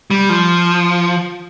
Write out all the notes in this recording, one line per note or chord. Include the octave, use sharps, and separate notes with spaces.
G3
F3